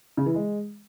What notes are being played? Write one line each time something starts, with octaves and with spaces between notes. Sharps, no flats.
C#3
E3
G#3